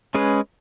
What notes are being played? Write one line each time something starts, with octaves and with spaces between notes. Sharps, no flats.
G#3 C#4 G#4 B4